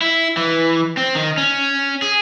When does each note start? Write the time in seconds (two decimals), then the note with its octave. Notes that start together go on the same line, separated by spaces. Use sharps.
0.02 E4
0.37 E3
0.97 C4
1.15 D#3
1.38 C#4
2.02 G#4